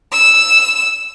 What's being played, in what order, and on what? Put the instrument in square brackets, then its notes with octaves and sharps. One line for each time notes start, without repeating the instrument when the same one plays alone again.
[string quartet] E6